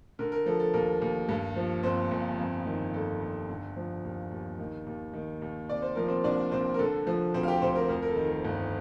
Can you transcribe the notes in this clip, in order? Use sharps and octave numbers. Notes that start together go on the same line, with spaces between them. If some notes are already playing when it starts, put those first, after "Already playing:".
D3 A#4
A#4
F3 A4
A4
D#2 A#4
D#2
G2
F3
G1 C4 C5
G1
F2
D#3
G1 A4
G1
D3
F3
D#2
D#2
D#3
D#2
D#3
D#2
C3 D5
C5
F3 A#4
C4 C5
C2 D4 D5
C2 C4 C5
A#4
D3 A4
F3
D2 C4 C5
F5
G4 G5
D2 C4 C5
A#4
F2 A#4
A#4
A4
D#3
A#4
G1